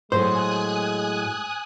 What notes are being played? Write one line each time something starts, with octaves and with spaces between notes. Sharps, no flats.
A2 F#3 G#3 A4 C5 G#5 D#6 F#6